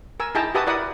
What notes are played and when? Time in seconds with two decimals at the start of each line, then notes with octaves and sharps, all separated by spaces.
0.20 A#4 G#5 E6
0.35 D#4 E4 G#4 G5 A5 A#5
0.55 F#4 G4 B4 E5 A5 D#6
0.67 E4 A#4 D5 F#5 D#6